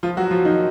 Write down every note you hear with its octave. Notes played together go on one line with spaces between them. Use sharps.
F3 F4
F#3 F#4
F3 F4
D#3 D#4